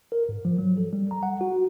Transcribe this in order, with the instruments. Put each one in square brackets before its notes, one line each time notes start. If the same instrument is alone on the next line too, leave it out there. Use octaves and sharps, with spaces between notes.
[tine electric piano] A#4
G#2
F3
F#3
A4
G3
A#5
F#5
F#4